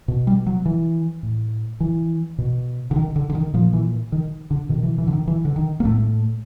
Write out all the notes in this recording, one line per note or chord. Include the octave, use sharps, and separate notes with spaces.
B2
G3
F#3
E3
A2
E3
B2
D3
D#3
D3
D3
D#3
A#2 F3
E3
D#3
D3
B2 D#3
E3
E3
D3
D#3
E3
D3
D#3
A#3
A2 A3